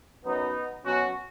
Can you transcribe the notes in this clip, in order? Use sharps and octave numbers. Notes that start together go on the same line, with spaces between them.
F#2 F#3 B3 D#4
B2 F#3 C#4 F#4